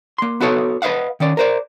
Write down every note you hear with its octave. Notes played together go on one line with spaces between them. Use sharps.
A#3 C6
B3 F#4 A4 C#5
B4 C5 D#5 F5 F#5
D#3 C#4 D5
A#4 C5 D5